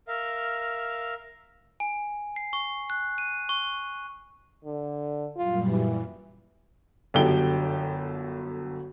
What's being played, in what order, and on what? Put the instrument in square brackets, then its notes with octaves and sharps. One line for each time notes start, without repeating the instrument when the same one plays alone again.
[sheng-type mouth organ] A#4 E5 F5
[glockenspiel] G#5
C7
C#6
F#6
D#7
C#6
[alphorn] D3
[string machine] F#2 A#2 G3 [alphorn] F4
[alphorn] E3
[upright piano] G1 F#2 D3 G4 G5 G7